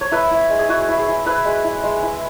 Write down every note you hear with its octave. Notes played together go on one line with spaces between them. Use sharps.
C#5
E4 B4 E5
E4
G#3
G#4
E4 F#4
E4
G#4
E4
E4 B4 E5
G#3
E4
G#3
E4